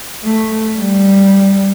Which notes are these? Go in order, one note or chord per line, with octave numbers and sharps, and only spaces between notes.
A3
G3